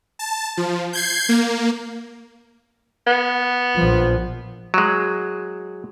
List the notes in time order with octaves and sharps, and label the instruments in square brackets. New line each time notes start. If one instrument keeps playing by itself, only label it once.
[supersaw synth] A5
F3
G6 G#6 C7
A#3
[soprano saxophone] B3
[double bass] A#1 F3
[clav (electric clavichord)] F#3 G#3